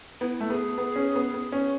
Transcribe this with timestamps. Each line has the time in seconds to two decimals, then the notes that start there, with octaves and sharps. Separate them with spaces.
0.21 B3 E4
0.40 A3
0.49 B3 G#4
0.78 B3
0.96 C#4
1.15 B3
1.34 B3
1.52 C#4